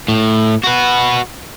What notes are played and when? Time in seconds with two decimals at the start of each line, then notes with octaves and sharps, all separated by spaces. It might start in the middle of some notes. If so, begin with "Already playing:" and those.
0.08 A2
0.64 F#4 B4